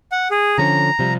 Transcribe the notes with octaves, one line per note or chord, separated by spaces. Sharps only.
F#5
G#4
D3 F3 C#4 A#5
C3 F3 G3